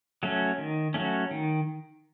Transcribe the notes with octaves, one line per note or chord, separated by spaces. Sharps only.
F#3 A3 C#4
D#3
F#3 A3 C#4
D#3